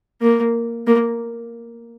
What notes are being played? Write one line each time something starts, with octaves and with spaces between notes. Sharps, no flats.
A#3
A#3